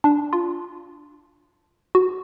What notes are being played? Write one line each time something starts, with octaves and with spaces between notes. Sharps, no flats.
D4
F4
F#4